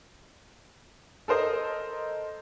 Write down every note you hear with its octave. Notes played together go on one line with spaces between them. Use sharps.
A4 A#4 C5 D#5